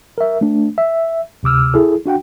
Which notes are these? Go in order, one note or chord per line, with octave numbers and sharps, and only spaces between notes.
A#4 E5
A3 D4
E5
D2 C3 D6 E6 F6
E4 G#4 A4
D4 F#4 F#5 G5